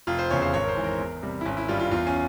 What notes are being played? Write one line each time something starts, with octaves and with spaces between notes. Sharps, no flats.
F1 F4
C5
E2 C#3 C#5
C5
G#1 C#5
A#4
C5
G#2 E3
A#4
E2
C3 G3
E4
G#1 C#4
E4
G2 G3 F4
F4
E2 F4
C#4